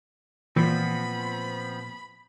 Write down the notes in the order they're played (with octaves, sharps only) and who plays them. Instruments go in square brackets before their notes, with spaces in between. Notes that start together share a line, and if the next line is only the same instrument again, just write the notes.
[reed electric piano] A#2 [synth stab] E3 [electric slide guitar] F3 B3 C4 [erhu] B5